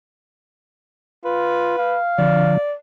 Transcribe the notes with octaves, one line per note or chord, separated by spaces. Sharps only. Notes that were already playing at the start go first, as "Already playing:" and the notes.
F4 B4
F5
D3 F3 D5